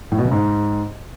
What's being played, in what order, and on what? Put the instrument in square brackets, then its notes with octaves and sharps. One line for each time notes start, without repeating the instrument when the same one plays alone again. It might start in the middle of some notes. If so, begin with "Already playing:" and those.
[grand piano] A2
B2
C#3
G#2